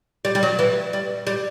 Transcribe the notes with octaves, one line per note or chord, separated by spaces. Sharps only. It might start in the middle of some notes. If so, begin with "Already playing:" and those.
G3
G3
F#3
E3
G3
G3